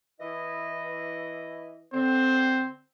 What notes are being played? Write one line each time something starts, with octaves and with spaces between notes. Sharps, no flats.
E3 E4 D#5
D3 C4 C5